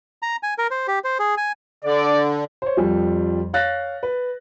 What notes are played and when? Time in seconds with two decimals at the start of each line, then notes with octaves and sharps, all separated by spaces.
0.22 A#5
0.43 G#5
0.58 A#4
0.71 C5
0.88 G4
1.04 C5
1.19 G#4
1.37 G#5
1.85 D3 D5
2.62 C5 C#5
2.77 F2 F3 G3
3.53 C#5 F5 F#6 A6 A#6
4.03 B4